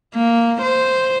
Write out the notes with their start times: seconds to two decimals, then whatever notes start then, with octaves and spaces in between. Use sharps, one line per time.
0.15 A#3
0.62 C5